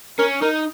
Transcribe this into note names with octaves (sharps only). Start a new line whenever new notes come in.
C#4 A#4
D#4 A#4